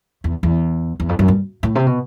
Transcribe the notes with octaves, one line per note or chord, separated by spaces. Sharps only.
E2
E2
E2
F2
F#2
G2
A2
C3
B2